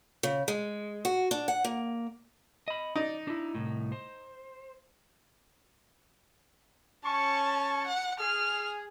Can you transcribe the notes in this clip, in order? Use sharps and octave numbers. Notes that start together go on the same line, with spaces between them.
C#3
G#3
F#4
D4
F#5
A#3
D#5 B5
D#4 D5
D4 E4
C2 A2
C5
C#4 A5 C#6
F#5
G#4 F6